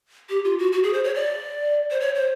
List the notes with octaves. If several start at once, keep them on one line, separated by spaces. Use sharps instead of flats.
G4
F4
F#4
F#4
G#4
C5
C#5
D5
C5
C#5
C5